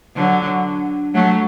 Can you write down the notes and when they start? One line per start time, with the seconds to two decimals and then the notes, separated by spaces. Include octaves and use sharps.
0.16 D3 F#3
1.14 F#3 A3